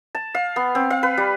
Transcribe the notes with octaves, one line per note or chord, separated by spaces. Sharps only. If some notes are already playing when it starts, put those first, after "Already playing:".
A5
F5
B3
C4
F5
B4
G3